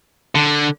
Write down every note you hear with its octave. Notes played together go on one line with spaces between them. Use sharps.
D3